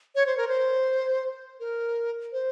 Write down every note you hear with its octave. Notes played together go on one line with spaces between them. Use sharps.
C#5
C5
A#4
C5
A#4
C5